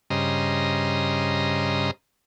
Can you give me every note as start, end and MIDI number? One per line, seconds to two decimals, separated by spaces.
0.10 1.91 43
0.10 1.91 49
0.10 1.91 72
0.10 1.91 75
0.10 1.91 82